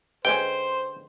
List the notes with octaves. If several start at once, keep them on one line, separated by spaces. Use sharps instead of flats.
D3 G#3 C#4 B4 C5 G5